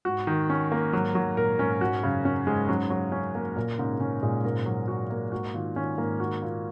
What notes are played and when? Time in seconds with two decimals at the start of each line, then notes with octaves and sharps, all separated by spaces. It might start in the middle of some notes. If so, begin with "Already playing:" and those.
0.05 G#2 F#4
0.27 D#3
0.50 C#4
0.72 A#3
0.93 G#2 F#3
1.15 G#2 F#3
1.37 A#2 A#4
1.59 G#2 C#4
1.80 G#2 F#4
2.03 F#2 C#3
2.25 F#2 C#4
2.46 G#2 G#3
2.69 C#3 F#3
2.90 F#3
3.12 C#4
3.35 A#3
3.56 A#2 A#4
3.78 G#2 C#3
4.00 C#3 C#4
4.22 A#2 G#3
4.44 G#2 A#4
4.66 F#3
4.88 F#4
5.10 A#3
5.32 G#2 F#4
5.54 A#2 D#3
5.75 D#3 C#4
5.97 G#2 A#3
6.20 F#4
6.42 A#2